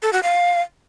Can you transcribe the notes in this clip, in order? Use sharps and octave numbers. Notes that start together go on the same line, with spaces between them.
A4
F#4
F5